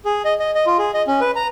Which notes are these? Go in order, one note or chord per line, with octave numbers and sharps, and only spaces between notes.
G#4
D#5
D#5
D#5
F4
G#4
D#5
C#4
B4
A#5